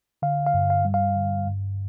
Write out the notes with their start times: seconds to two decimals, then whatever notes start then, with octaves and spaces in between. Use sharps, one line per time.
0.22 D3 F5
0.47 F5
0.54 G2
0.70 F5
0.85 G3
0.94 F5
1.16 D3
1.47 G2